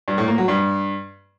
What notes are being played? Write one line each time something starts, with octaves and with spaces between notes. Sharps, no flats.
G2
A2
A#3
F#3
G2